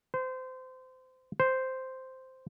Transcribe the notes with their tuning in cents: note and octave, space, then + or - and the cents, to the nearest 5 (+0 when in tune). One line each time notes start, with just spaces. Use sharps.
C5 -25
C5 -5